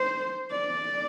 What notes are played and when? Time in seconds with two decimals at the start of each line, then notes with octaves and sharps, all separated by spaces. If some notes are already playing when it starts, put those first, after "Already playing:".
Already playing: C5
0.51 D5